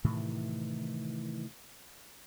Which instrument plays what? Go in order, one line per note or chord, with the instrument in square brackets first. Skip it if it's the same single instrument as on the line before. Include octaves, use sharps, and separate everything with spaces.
[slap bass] A2 C3 D#3 E3